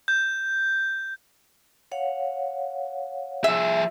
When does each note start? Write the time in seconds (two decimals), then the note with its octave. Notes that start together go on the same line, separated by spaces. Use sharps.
0.08 G6
1.92 C#5 F5 F#5
3.44 F3 G#4 E5